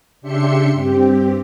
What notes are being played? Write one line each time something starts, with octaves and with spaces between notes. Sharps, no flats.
C#3 D4 G4 E5 C6 C#7
G2 C4 G4